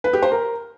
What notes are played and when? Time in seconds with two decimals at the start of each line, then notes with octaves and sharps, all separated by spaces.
0.04 B4
0.13 G4
0.22 C5
0.32 A#4